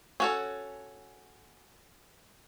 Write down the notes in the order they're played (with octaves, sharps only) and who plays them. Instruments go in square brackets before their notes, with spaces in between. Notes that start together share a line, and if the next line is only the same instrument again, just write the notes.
[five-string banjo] C#4 F#4 A4